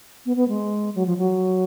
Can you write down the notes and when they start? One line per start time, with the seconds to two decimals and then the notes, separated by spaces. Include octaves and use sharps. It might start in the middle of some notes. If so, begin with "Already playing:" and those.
0.26 B3
0.36 B3
0.48 G#3
0.95 F#3
1.06 F3
1.18 F#3